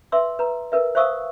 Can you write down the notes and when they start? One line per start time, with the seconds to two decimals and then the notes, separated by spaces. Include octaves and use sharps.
0.12 B4 E5 C6 D6 E6
0.39 B4 A#5
0.72 A#4 B4 E5
0.95 C5 E5 F5 C#6 D#6 E6